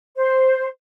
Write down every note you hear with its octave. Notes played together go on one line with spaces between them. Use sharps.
C5